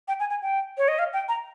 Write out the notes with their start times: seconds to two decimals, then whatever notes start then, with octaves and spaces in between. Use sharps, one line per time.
0.08 G5
0.20 G#5
0.30 G#5
0.42 G5
0.78 C#5
0.88 D#5
0.99 F5
1.13 G5
1.28 A#5